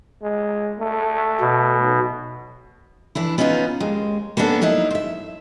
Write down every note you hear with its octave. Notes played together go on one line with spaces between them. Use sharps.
G#3
A3
B2
B1
E3 D4 E4
B3 C#4 D#4 F4 B4
D#2 G#3
A#3 B3 C#4 D4 A4
F#3 D#4 E4 A#4
C5 E5